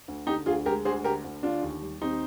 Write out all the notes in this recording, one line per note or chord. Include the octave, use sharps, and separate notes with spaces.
D2
D3 D#4 G4
D2 F4 G#4
G#3 G4 A#4
D2 G#4 C5
D3 G4 A#4
D2
D3 D4 F4
D#2
G3
D#2 C4 D#4